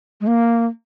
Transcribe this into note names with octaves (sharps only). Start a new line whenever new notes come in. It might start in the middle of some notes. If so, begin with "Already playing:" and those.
G#3
A#3